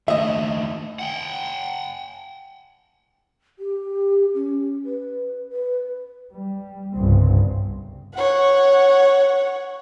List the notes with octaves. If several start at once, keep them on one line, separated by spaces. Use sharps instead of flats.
D#2 A3 D#5 E5
F#5 G5
G4
C#4
B4
B4
G3
G1 C2 G2 C#3 C4
C#5 F#5